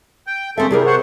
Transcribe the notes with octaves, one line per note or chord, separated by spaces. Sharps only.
G5
C#3 G#3 C4 A4 E5
C3 E3 G3 G#4 A#4
C5 C#5 F#5